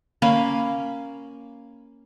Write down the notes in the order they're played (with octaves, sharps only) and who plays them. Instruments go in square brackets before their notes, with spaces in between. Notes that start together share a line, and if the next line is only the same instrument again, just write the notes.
[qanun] A#3 C#4 F5 B5